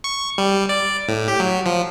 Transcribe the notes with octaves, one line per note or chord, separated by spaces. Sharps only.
C#6
G3
D5
A2
G4
F#3
F3